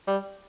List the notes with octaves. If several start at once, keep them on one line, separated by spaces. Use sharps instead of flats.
G3